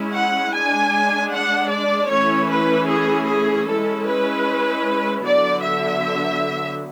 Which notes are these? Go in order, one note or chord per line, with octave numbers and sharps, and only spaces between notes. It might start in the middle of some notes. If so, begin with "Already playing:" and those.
Already playing: G#3 C#4 E4
F#5
G#3 D4 G#5
F#5
D5
E3 A3 C#4 E4 C#5
B4
G#4
G#4
G#3 C#4 E4 A4
B4
D3 F#3 B3 D5
E5